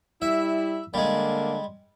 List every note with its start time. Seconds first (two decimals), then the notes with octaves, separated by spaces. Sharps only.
0.22 G3 E4 E5
0.94 D3 G3 G#3 A#3